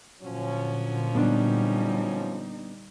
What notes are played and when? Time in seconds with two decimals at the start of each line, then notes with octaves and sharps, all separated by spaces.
0.22 A#2 D3 F3 F#3 C#4
1.15 G3 B3 D4 D#4